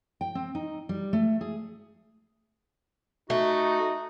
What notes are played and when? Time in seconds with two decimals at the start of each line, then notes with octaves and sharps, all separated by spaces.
0.21 G5
0.35 C4
0.55 D#4
0.89 G3
1.13 A3
1.41 G#4
3.30 A3 D#4 F#4